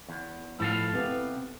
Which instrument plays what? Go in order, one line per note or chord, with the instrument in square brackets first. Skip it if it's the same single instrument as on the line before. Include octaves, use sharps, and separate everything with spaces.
[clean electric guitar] E2
[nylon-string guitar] A2 F3 [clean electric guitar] E4 A4 F5
[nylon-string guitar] C3 B3